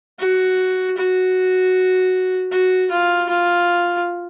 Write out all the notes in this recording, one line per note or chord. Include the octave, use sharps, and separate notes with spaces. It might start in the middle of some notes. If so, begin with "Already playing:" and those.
F#4
F#4
F#4
F4
F4